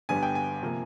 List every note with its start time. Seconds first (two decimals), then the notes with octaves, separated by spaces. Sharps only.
0.09 G1 G2 D3 G3 B3 G#5
0.23 G5
0.35 G#5
0.62 C3 F3 A#3